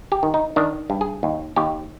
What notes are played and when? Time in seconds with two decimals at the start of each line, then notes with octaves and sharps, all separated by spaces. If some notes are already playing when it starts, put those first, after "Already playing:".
0.12 G4
0.23 D#3
0.34 D#4
0.56 D#3 D4
0.90 G2
1.01 G#4
1.23 D#2
1.56 D#2 G4